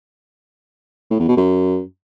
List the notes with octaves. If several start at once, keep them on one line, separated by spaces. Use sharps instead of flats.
A2
E2
B2
F#2